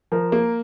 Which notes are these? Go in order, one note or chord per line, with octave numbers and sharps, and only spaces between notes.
F3 A#4
A#3